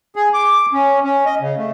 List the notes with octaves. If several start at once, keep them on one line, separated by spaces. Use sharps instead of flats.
G#4
D6
C#4
C#4
D#5
C#3
A3